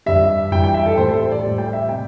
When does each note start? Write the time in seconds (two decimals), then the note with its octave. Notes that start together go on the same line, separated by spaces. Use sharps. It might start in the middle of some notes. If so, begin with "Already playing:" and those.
0.06 G2 G3 E5
0.51 G2 E3 G3 G5
0.64 G5
0.74 E5
0.86 A4
0.97 A2 G3 C5
1.09 A4
1.32 D5
1.43 A2 G3
1.58 G5
1.73 E5
1.89 C3 G5